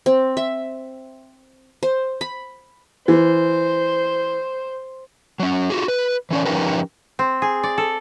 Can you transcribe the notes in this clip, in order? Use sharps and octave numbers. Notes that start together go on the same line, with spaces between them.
C4
E5
C5
B5
E3 C5
F#3 C#4
F4 F#4 G#4
B4
E3 C#4 D5
F3 C#4 D#4 G4 A#4 B4
C4
G#4
D5
A4